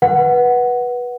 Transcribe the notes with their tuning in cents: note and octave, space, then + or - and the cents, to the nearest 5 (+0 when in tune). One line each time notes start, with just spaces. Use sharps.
B4 -15 F#5 +0